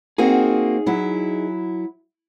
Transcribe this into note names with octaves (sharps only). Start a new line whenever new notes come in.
A#3 C4 D#4 F#4 G#4
F#3 E4